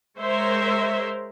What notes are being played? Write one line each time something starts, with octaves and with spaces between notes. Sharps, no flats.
G#3 A#4 C5 C#5 E5